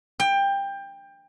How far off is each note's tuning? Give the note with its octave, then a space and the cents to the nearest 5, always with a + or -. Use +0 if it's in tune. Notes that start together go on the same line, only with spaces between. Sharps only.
G5 +20